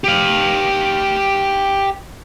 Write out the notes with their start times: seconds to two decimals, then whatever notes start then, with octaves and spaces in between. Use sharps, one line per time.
0.04 G4 F5